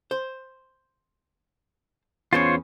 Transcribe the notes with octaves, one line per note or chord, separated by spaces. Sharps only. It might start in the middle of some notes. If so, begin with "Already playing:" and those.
C5
E2 B3 C#4 F4 C5 C#5